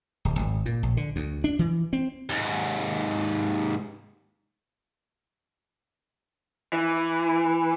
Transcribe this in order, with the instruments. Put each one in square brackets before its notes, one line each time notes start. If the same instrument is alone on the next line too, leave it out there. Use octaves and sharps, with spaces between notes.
[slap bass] D1
G#1
A#2
A#1
D3
D2
D4
E3
C4
[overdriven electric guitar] D#2 G#2
[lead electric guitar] E3